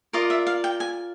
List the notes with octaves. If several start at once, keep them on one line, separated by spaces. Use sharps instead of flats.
F4 A#4 D5 D#5
E5
F5
G5
G#5